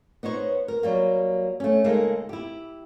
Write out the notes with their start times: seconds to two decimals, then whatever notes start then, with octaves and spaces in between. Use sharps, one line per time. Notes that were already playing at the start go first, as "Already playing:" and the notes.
0.23 B3 D#4 C5 C#5
0.68 A#4
0.83 F#3 G3 A#3
1.60 A3 C#4
1.84 C#3 G#3 A#3 D#4 A4 A#4
2.29 E4 G4